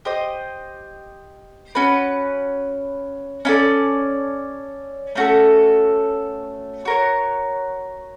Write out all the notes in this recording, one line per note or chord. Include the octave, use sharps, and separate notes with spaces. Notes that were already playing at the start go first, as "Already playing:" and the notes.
G4 C5 D#5
C#4 F#4 B4
C#4 E4 A4 D5
A3 C#4 F#4 A4
F#4 A#4 C#5